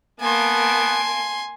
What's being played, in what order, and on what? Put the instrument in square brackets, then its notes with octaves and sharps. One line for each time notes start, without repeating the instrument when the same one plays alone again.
[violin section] A#3 A5 D7 [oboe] B3 [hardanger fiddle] G#5 C6